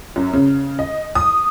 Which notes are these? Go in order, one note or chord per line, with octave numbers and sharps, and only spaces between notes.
F#2
C#3
D#5
D#6